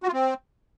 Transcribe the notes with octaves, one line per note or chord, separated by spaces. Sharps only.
F#4
F4
C4